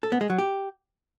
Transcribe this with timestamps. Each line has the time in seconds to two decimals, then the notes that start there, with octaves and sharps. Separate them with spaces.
0.03 A4
0.12 B3
0.21 G#3
0.30 F#3
0.38 G4